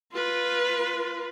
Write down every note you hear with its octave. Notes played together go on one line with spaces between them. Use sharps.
F4 B4